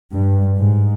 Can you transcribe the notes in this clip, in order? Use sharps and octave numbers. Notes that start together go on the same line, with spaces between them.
G2
G#2